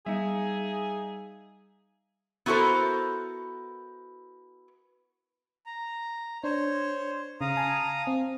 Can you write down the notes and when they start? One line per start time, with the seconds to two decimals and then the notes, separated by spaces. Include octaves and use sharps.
0.06 G3 D#4 G#4 E5 F5
2.46 B3 E4 F#4 A4 A#4 C5
5.66 A#5
6.44 D4 C5 C#5
7.41 C#3 F5 A#5 D#6
7.57 G#5 A5
8.07 C4